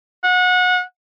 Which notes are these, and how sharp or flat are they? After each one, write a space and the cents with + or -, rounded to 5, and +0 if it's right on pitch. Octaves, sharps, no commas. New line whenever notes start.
F#5 -30